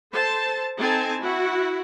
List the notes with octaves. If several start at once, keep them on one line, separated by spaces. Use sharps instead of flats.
A4 C5 A5
C4 D#4 A4 G#5 A5
E4 F#4 F#5